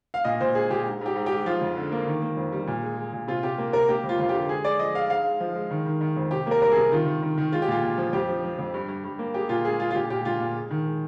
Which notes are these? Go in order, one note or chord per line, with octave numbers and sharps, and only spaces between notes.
F5
A#2 D#5
A#2 C5
G#3 G#4
A#2 G4
G#2
G#2 G4
G#2
G4
G#2
F3 F4
F2
D3
A#3
D#3
A#3
F2
G3
A#2
G#3
G#3
A#2
C3 F4
C3 G4
A#3
C3 A#4
A#3 G4
F2
F4
F2 F4
D3 G4
G#3 G#4
G#3 D5
F3 D#5
G#3 F5
G#2 F5
G#3
F3
G#3
D#3
D#3
D#3
F2
C3 G4
A#3 A#4
G3 A#4
G#4
C3
D#3 F4
D#3
D#3
D#3
G#3 F4
G4
A#2 F4
A#2
F3
F2 G4
F3
F3
F2
G2
G2
G2
A#3
G#3 G4
A#2 F4
G#3 G#4
G#3 F4
F4
A#2 G4
A#2 G4
A#2 F4
A#2
G#3
D#3
G#3